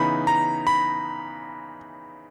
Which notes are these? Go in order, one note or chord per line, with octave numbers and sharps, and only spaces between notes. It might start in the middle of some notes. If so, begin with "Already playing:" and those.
Already playing: C#3 E3 B3 D#4 B5
A#5
B5